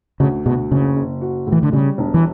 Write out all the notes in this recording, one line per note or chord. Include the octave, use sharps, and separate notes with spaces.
D2 C#3
D2 B2
F#1 C#3
F#1
F#4
A2
E3
D3
C#3 G3
E1
E3